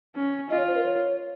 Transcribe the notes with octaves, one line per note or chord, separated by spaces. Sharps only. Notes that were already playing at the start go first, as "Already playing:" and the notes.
C#4
F4 D#5
C#5
C5
A#4
C#5